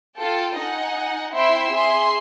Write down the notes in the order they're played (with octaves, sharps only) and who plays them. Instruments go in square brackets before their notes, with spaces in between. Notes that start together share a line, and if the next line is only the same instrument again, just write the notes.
[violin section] F4 A4 G5 A5
D#4 D#5 F#5 G#5
C4 E4 E5 G5 C6 E6
G#4 E5 G#5 C6